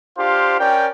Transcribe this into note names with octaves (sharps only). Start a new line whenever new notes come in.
D4 F4 G4 C5 F5
C#4 A#4 D5 G5